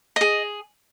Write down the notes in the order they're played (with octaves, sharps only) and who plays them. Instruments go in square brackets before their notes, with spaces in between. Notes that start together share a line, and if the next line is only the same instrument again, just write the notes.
[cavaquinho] G#4 D#5